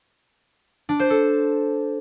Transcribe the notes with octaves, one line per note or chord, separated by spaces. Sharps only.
D4
C5
A4